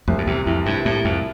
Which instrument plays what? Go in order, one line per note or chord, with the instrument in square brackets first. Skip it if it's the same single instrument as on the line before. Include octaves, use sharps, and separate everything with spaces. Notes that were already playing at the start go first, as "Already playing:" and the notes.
[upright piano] C2 [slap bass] F2
[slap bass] F2
[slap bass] E2 [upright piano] C3
[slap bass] F2 [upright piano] E3
[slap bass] G2 [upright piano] C3
[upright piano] C2 [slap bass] A2
[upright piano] C2 [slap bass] F2